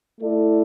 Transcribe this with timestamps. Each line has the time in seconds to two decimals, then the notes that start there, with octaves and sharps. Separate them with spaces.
0.20 A3 E4 A4 D5